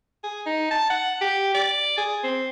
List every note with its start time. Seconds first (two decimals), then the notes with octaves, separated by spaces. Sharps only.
0.24 G#4
0.46 D#4
0.71 A5
0.90 F#5
1.21 G4
1.55 D5
1.98 G#4
2.24 C4